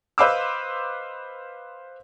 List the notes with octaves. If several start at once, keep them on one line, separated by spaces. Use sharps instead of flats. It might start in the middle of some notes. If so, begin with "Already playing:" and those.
B4 C5 D#5 F5 D6 E6